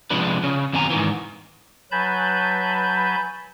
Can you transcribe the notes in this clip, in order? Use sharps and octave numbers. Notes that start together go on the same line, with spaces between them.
C3 F3 G#3 D4 B4
C#3 C#4
F#2 B2 D#3 C4 G#5 A#5
G#2 D#3 E3
F#3 B4 G#5 A5 B5 G6